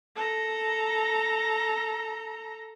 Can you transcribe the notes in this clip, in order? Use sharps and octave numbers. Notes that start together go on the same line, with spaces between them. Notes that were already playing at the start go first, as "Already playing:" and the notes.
A4 A#5